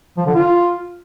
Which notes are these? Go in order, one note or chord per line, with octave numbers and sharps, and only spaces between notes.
F3
D3
F4